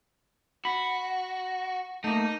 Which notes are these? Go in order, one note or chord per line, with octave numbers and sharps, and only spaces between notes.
F#4 B5
A3 A#3 D#4